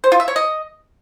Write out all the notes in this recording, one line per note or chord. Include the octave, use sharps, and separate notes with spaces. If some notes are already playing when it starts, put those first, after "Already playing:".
C5
F4
E5
C#5
D#5